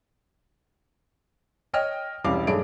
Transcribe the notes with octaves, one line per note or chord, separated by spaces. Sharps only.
C#5 D#5 G5 F6
E1 C2 G3 C#4 F5 D6
B1 G2 A3 G#4 C#5 D7